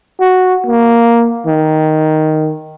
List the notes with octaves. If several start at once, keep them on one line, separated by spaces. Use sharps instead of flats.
F#4
A#3
D#3